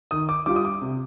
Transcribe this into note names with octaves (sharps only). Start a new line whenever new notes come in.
D#3 D#6
D6
G3 D4 F4 D6
D#6
D6
C3